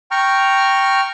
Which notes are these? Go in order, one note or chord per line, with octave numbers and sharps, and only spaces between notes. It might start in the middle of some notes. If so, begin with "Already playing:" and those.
G5 A#5 C#6 F6